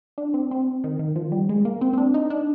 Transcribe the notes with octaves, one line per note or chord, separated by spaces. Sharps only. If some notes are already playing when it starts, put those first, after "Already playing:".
D4
C4
C4
D#3
D#3
F3
G3
G#3
A#3
C4
C4
D4
D#4
D4